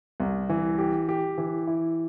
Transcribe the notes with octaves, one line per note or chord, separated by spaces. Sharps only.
C2
E3
G4
G4
E3
E4